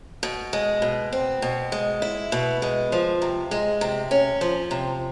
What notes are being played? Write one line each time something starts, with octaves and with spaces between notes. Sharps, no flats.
B2
G#3
B2
C4
B2
G#3
E4
B2
G#3
F3
C3
G#3
C3
C#4
F3
C3